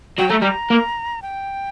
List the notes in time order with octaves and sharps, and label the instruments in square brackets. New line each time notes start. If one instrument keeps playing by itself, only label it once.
[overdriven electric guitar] F#3 [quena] G5
[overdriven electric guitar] A3 [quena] A#5
[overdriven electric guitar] G3 [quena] A#5
[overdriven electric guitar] A#3
[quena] G5